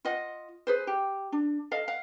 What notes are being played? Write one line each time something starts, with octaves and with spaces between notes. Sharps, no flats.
F4 D#5 F#5
G#4 B4 C5
G4
D4
A4 D#5 F5
F5 F#5